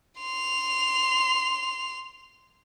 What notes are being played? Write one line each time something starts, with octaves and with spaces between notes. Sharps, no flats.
C6 F7